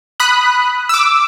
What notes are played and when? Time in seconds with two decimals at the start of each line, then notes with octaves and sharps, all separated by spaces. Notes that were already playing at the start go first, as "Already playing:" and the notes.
0.20 B5 D#6 F#6
0.89 D6 E6